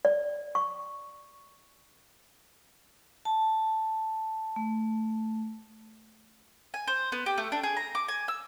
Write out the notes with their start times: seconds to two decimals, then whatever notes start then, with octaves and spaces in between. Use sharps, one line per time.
0.05 D5
0.55 C#6
3.25 A5
4.56 A3
6.74 G#5
6.87 C5
7.12 B3
7.26 G4
7.38 A3
7.52 D4
7.63 G#4
7.77 A#5
7.95 D6
8.08 G#5
8.28 E6